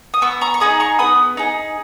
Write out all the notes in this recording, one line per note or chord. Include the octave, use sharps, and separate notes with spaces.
D#6
B3 C#6 E6
A#5 C#6
C#6
D#4 G#4 B5 D#6
A#5 C#6
B3 B5 D#6
D#4 G#4